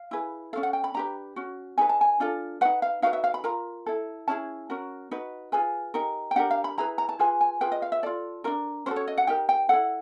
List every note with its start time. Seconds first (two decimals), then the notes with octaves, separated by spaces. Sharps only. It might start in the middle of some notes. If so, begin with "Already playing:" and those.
Already playing: F5
0.11 E4 G#4 B4
0.53 C#4 F#4 A4 F5
0.63 F#5
0.73 G5
0.84 B5
0.94 D4 G4 B4 A#5
1.36 C#4 F#4
1.78 D#4 G#4 B4 G#5
1.89 A5
2.01 G#5
2.20 D4 F4 A4
2.61 F#4 B4 F#5
2.65 D#4
2.82 F5
3.02 D#4 F#4 B4 F5
3.13 E5
3.24 F5
3.34 B5
3.44 F4 A#4 A#5
3.86 E4 A4
4.28 C#4 E4 G#4 A5
4.70 C#4 F#4 A#4
5.11 D#4 F#4 B4
5.52 F4 G#4 B4 G#5
5.94 D#4 G4 A#4
6.31 G5
6.36 D4 G4 A#4 F#5
6.51 F5
6.64 B5
6.78 E4 G#4 B4 A#5
6.98 A#5
7.09 A5
7.19 F4 G#4 B4 G#5
7.41 G#5
7.61 F4 G#4 B4 G5
7.72 D#5
7.82 F5
7.92 E5
8.03 F4 A4 D5
8.44 D4 F4 A#4
8.86 C#4 F#4 A4 C5
8.96 C#5
9.08 D#5
9.18 F#5
9.27 D#4 G4 A#4 G5
9.49 G5
9.69 E4 A4 F#5